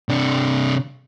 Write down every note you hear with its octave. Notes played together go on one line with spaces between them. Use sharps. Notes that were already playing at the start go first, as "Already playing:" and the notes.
C3 D4